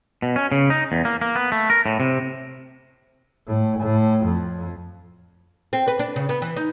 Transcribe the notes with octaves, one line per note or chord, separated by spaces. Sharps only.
B2
C#4
C#3
D#4
E2
A#3
A#3
B3
A3
A#4
A2
C3
A2
A2
F2
C4
B4
D4
C#3
B3
E3
D#4